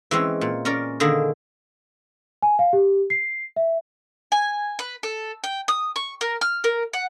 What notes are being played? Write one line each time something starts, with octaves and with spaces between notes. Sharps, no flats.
E3 G#3 C4 C#4
A#2
C#4 A#4 D5
D3 D#3 A#3 D4 G#4
G#5
F5
G4
C7
E5
G#5
B4
A4
G5
D#6
C#6
A#4
F6
A#4
F#5